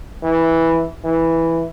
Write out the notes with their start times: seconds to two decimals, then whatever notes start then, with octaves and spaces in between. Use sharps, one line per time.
0.23 E3
1.04 E3